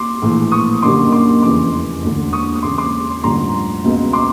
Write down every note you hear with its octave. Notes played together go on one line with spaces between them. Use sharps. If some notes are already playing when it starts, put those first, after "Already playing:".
Already playing: C6 D6
A#1 A2 E3
C#6 D#6
F#1 F#2 D3 G3 A#3 C6 D6
C6 D6
F1 E2 C#3 E3 G3 C6 D6
E1 D2 D3
C#6 D#6
D#6
E1 E2 C#3 C6 D6
C6 D6
A1 G2 D3 F3 A#5 C6
C#2 B2 G#3 B3
C6 D6